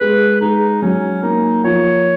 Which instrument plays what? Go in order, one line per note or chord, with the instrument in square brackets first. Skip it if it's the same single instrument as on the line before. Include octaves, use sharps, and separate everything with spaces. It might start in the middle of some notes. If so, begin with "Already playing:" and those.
[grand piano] G#3 [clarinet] B4
[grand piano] G#3 [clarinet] D#4
[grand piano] F#3 [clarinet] C#4
[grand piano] A#3 [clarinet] D#4
[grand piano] F3 [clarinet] C#5